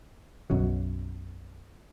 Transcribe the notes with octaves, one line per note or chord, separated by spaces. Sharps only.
B1 F#2 F#3